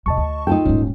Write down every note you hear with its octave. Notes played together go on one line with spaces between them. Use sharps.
D#2 B2 D#5 A5 C#6
D2
D#4 F4 A4 G5
D#1 G#2 C#4